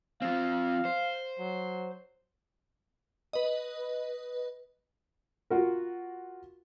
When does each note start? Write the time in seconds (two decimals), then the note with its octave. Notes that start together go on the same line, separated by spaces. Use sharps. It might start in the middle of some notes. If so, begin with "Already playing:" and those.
0.22 F3 C4 F5
0.85 C5
1.39 F#3
3.33 B4 D#5
5.50 F4 F#4 A#4